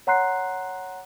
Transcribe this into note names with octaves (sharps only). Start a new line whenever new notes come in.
C#5 F#5 A#5 C6 F#6 C7